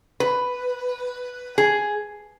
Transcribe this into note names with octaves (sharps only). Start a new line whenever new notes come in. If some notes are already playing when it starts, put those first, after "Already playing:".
B4
G#4